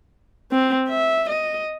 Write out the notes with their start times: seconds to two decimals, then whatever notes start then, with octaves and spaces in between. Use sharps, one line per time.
0.52 C4
0.88 E5
1.30 D#5